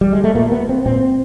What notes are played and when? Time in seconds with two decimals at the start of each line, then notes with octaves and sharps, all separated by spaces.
0.01 G3
0.13 G#3
0.24 A3
0.35 A#2 A#3
0.52 B3
0.69 C4
0.86 A#2 C4